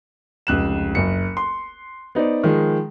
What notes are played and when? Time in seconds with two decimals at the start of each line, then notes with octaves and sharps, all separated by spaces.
0.47 F1 C#2 F#6 E7
0.95 F#1 C#7
1.37 C6
2.15 B3 D#4 C5 D5
2.44 D#3 F3 G#3